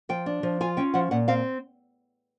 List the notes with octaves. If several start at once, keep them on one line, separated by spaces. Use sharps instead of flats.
F3 G5
D4
F3
F4 G#5
C#4 G5
F3 F#5
A#2 F#5
C4 F5